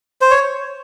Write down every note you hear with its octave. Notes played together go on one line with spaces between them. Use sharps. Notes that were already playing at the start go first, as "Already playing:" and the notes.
C5
C#5